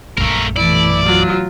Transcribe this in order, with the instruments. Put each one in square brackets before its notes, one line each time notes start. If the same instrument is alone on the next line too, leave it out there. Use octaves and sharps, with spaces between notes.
[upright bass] A#1 F#2 [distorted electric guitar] A3 A#4
[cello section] B2 E3 A3 [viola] E4 [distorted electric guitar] D5
[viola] F#3 F4